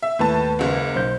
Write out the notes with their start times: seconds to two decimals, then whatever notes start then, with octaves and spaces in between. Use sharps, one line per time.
0.02 E5
0.19 D#2 A2 B4 A5
0.59 F#1 C#2
0.95 B1 C5 G6